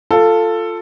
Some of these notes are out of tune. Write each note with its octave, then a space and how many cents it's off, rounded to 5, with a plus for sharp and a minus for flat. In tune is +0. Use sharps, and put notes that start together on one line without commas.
F4 +0 A4 +10